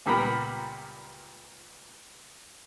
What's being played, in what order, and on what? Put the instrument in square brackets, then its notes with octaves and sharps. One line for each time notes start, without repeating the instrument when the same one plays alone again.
[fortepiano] C#2 A#2 G3 B3 A#4 B5